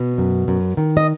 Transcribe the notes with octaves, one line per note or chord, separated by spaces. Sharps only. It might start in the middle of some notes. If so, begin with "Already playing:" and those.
Already playing: B2
F#2
F#2
D#3
D#5